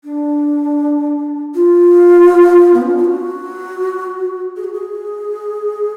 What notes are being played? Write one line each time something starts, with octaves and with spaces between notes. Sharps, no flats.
D4
F4
B3
C#4
D4
F4
F#4
G#4
F#4
G#4